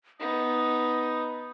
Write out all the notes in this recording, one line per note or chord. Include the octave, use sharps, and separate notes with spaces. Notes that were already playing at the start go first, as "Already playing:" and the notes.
B3 D#4 D#6